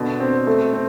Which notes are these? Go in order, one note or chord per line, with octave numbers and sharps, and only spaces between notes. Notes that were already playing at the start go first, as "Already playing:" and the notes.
Already playing: B2 D3
C4
A3
C4